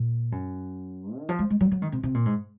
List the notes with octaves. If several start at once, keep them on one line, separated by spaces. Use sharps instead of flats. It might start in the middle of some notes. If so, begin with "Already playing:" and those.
Already playing: A#2
F#2
D#3
F3
G#3
G#3
F#3
F#3
D#3
C3
C3
A#2
G#2